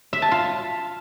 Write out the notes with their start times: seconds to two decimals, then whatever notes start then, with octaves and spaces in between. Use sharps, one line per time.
0.13 E5
0.22 A5
0.32 F4